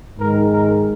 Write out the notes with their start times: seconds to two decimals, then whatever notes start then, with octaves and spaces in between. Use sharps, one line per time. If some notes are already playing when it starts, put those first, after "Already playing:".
0.18 G#2 D#3 G#3 A#4
0.51 A#4